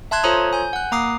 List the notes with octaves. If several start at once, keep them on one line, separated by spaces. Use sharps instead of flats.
E5 A5 C6 F#6 G#6
F4 A4 C5 C#5 A#5 D#6
G#5 G6
F#5 F#6
A#3 A#5 D6 D#6 C7